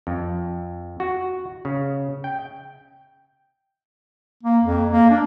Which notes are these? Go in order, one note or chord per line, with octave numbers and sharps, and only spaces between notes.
F2
F#4
C#3
G5
A#3
F2
A#3
D4